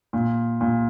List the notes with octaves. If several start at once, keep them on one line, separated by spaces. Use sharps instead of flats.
A#2
A#2